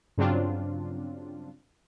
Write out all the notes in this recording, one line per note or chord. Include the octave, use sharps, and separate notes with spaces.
G2 C#3 F#3 C4 D4 F4